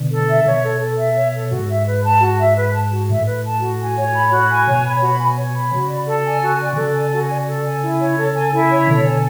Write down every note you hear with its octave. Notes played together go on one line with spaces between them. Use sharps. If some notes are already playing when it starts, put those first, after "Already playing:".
Already playing: B2 D3
A4
E5
B2 C#5
A4
A4
E5
C#5
A4
G#2 F#4
E5
B4
A5
F#4
E5
B4
A5
F#4
A2 E5
B4
A5
F#4
G#5
C#5
B5
F#4
G#5
B2 C#5
B5
F#4
G#5
C#5
B5
C#3 F#4
D5
A4
G#5
F#4
D5
B2
C#3 A4
G#5
F#4
D5
A4
G#5
E4
C#5
A4
G#5
E4
C#5
B2 D3 A4
G#5